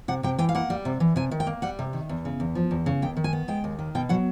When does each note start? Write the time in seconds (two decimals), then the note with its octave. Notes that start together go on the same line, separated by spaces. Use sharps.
0.08 C3 F#5
0.23 C3 G5
0.39 E3 G5
0.49 F5
0.55 A#3 F#5
0.70 G3
0.85 C3
1.00 E3
1.16 C3 G#5
1.31 D#3
1.40 G5
1.47 A#3
1.62 G3 F#5
1.79 C3
1.93 D#3
2.09 E2
2.25 C#3
2.40 E2
2.55 F3
2.71 E2
2.86 C#3
3.02 D#2 G5
3.17 D#3
3.24 G#5
3.33 B3
3.48 G#3 G5
3.64 D#2
3.79 D#3
3.95 B2 G5
4.09 F#3 F#5